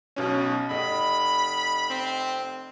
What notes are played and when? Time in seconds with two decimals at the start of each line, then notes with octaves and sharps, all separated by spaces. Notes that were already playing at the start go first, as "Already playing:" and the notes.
0.16 B1 B2 C#4
0.71 F1 D#5 B5
1.90 C4